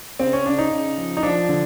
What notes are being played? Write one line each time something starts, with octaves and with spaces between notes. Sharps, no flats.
C#3 C4
C#4
C#3 D4
D#4
C#3
F3
D#4
F3 D4
D3